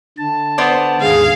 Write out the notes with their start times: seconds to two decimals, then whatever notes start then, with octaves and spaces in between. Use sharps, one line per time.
0.18 D3 A5
0.58 B3 C5 D5
1.01 D#2 G#2 D3 G#4 F5